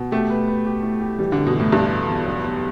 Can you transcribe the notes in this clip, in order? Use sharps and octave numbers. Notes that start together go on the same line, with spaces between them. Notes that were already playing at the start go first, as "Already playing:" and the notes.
Already playing: B2
A3 G4
B4
B4
G4
A2
G4
E3 G3
D3 A3
B2
A2 E3
G2 E4
A3
E2
B1
B1